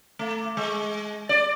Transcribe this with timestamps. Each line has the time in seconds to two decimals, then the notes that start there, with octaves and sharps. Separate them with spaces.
0.19 A3
0.57 G#3
1.29 D5